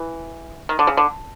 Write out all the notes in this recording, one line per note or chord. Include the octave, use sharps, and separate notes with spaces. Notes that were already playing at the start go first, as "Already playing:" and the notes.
Already playing: E3
D#3
D3
C#3
D3